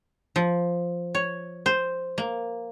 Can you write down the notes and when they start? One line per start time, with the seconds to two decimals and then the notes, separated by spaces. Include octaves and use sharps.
0.36 F3
1.15 C#5
1.66 C5
2.18 A#3